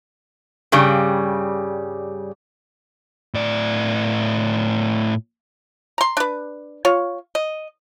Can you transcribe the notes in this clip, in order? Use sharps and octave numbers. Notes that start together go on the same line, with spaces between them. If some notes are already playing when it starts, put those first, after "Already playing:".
G2 C#3 G3
A2 D5
A#5 C6
D4 B4
F4 C#5
D#5